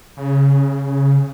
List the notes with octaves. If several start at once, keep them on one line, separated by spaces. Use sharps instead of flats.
C#3